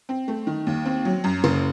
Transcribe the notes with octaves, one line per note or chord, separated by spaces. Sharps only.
C4
A3
D#3
D#2
C4
F#3
F#2
F#1